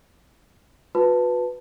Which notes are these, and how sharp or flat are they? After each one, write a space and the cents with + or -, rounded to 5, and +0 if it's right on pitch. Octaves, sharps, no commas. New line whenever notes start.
F#4 -45 B4 +0 A5 +0